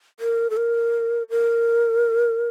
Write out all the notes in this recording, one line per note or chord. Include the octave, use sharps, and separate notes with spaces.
A#4
A4
A#4
A#4